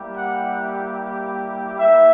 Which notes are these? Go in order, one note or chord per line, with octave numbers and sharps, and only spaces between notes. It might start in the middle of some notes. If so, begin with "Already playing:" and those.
Already playing: G3 A#3 E4 G4
F#5
A#3 E4 E5